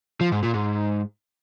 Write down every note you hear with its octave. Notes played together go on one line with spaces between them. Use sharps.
F3
G#2
A#2
G#2